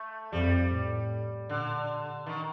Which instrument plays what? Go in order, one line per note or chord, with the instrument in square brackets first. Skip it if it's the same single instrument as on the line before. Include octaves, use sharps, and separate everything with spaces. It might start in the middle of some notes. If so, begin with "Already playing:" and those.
Already playing: [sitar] A3
[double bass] F2 [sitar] G3
[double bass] A2
[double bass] A#2 [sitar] D3
[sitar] D#3